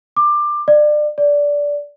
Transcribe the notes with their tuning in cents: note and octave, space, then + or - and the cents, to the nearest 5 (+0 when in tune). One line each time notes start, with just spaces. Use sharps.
D6 +20
D5 +30
D5 -15